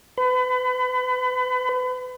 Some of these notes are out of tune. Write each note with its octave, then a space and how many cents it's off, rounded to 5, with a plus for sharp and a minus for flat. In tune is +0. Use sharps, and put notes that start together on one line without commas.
B4 +35